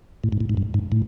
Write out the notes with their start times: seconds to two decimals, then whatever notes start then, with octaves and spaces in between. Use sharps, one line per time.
0.24 A2
0.32 G#2
0.40 A2
0.49 G#2
0.57 G2
0.74 G#2
0.92 A2